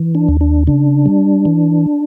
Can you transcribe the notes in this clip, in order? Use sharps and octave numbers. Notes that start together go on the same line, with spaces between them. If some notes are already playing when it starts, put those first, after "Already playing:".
Already playing: E3
D4
D#2
D4
C#3 D4
G3
E3